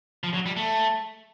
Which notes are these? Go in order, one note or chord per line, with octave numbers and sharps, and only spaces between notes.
F3
F#3
G3
A3